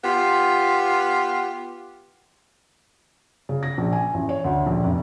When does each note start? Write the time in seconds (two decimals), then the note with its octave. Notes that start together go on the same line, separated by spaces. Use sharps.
0.04 B3 F4 G4
3.49 C#3
3.63 A#6
3.78 A#1
3.93 G#5
4.14 A1
4.29 C#5
4.44 D2
4.66 A#1
4.84 F1